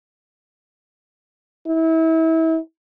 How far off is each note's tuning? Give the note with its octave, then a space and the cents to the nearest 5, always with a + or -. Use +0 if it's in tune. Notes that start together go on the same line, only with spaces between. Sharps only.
E4 -30